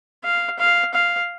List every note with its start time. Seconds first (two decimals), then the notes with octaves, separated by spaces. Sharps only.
0.24 F5
0.59 F5
0.94 F5